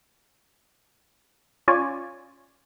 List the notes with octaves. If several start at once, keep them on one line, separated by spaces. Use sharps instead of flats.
C#4 F4 C#5 D5 G#5